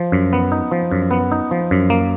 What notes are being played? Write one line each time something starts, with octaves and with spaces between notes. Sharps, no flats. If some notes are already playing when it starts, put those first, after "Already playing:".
Already playing: F3
F#2
B3
D#4
F3
F#2
B3
D#4
F3
F#2
A#3